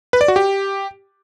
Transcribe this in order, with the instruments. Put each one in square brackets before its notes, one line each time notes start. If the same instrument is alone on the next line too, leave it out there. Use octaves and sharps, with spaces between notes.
[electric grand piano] B4
D5
F#4
G4